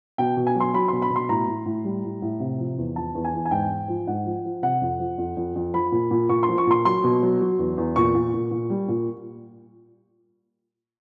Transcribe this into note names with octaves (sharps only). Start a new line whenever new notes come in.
B2 G5
B2
G#5
F#3
C6
F#3 B5
B2 C6
B5
B2
C6
A2 A#5
A2
A2
G3
A2
A2
C3
F3
E2
F3 A5
E2
G#5
E2
G#5
G#2 G5
G#2
F3
G#2 F#5
F3
F3
C3 F#5
F2
F3
F2
F2
F2
F3 B5
A#2
A#2
A#2 C#6
C6
F3
C#6
A#2 C6
F#3 C6
B2
F#3
F#3
E2
E2
A#2 C#6
A#2
A#2
A#2
G3
A#2